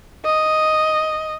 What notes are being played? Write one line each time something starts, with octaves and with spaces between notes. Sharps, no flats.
D#5